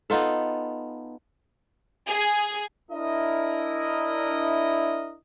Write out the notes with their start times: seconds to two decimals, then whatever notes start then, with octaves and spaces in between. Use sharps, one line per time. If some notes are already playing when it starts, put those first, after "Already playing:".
0.10 B3 D#4 F4 A4
2.08 G#4
2.91 D4 E4 A#4 D#5